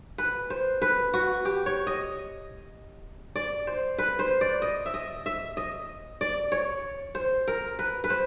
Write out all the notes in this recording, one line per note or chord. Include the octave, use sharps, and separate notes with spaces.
B4
C5
B4
F#4
G4
C#5
D#5
D5
C5
B4
C5
D5
D#5
E5
D#5
E5
D#5
D5
C#5
C5
A#4
B4
B4
C5